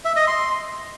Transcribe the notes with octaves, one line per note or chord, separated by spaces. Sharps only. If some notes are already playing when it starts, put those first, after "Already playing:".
E5
D#5
C6